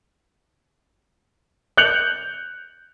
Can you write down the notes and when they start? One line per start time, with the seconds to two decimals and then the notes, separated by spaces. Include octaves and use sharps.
1.77 F#6 G6 C#7 F7 F#7